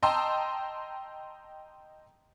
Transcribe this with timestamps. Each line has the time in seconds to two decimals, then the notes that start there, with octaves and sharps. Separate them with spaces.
0.02 D#5 G5 A5 A#5 C6 E6